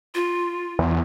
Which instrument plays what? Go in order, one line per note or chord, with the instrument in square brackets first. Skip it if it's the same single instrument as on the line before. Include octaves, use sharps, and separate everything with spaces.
[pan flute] F4
[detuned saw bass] E2